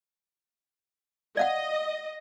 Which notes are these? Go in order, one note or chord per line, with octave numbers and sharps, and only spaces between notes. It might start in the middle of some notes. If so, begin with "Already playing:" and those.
D5 D#5 F5 F#5